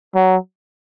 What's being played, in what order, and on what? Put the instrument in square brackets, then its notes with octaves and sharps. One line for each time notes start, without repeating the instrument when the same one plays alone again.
[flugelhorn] F#3